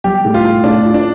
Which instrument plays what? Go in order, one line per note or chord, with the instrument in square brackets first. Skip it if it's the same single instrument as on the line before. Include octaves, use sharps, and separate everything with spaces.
[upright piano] G3 [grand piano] G4
[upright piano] A2
[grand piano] F4
[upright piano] A2
[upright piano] A2 [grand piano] D4
[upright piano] F4
[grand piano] D4